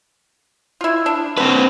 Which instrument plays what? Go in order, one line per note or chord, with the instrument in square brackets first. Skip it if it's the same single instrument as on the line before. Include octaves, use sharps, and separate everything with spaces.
[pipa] E4 F4
D4
[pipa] D3 [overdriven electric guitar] C4 B4